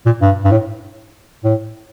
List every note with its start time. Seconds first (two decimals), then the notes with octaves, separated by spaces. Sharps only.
0.06 A#2
0.21 G2
0.45 G2
0.51 A2
1.44 A2